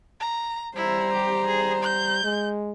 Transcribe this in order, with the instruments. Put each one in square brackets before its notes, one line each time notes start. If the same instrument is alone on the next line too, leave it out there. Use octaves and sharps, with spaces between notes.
[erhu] A#5
[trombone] G3 [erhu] E4 [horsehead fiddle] C5 A#5
[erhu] G4
G#4
G6
[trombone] G#3